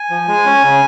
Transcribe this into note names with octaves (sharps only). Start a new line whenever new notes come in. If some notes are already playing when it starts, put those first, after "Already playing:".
Already playing: G#5
F3
G#3
C#4
C#3